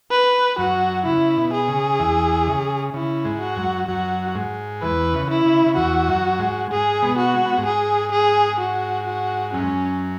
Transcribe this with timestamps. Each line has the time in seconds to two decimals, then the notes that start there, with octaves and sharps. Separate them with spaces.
0.11 B4
0.58 F#2 F#3 F#4
1.05 C#3 E4
1.37 B2
1.53 G#4
1.68 C#3
2.00 E2 E3
2.47 C#3
2.94 C#3 E4
3.25 G#2 G#3
3.41 F#4
3.57 F#2 F#3
3.88 F#2 F#3 F#4
4.35 G#2 G#3
4.82 E2 E3 B4
5.13 C#3
5.30 E4
5.46 C#3
5.66 C#3
5.77 E2 E3 F#4
6.08 F#2 F#3
6.39 G#2 G#3
6.71 G#2 G#3 G#4
7.02 B2 B3
7.18 F#4
7.34 G#3
7.46 B3
7.58 G#2 G#3
7.66 G#4
8.12 G#4
8.60 F#4
9.07 F#4
9.53 F#2 F#3 C#4